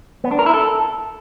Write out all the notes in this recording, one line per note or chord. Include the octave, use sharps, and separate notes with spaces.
B3
D4
A#4
E4
A4